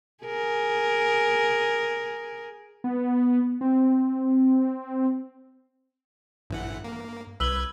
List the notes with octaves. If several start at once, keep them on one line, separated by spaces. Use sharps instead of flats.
G#4 A#4
B3
C4
A1 G2 E3 F#5
A#3
C2 B4 E6 G#6 F#7 G7